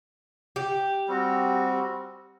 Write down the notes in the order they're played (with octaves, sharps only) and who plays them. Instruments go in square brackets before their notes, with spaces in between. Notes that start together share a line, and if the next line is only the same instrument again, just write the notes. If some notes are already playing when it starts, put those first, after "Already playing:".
[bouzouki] G4
[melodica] G3 C4 F#4